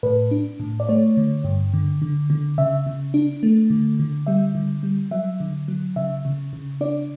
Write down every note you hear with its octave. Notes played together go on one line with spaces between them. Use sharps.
A2 B4
D4
A2
D5
A3 C#5
D3
G2
D3
D3
D3
C#3 E5
C#3
D4
A3
D3
D3
G3 E5
D3
G3
F#3 E5
D3
F#3
C#3 E5
C#3
C#3
D4 D5